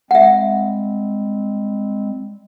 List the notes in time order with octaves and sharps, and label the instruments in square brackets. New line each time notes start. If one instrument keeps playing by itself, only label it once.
[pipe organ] G3 G#3 C4 [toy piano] E5 F#5